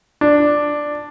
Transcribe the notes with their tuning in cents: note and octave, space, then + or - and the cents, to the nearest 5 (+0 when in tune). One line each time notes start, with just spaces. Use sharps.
D4 +5